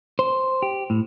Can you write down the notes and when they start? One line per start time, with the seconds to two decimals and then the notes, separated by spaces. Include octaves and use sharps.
0.19 C5
0.62 G4
0.90 A2